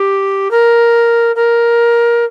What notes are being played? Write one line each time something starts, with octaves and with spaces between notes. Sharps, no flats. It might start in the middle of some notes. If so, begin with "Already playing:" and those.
Already playing: G4
A#4
A#4